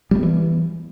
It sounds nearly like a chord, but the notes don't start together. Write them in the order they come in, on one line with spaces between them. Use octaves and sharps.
G3 A3 B3 E3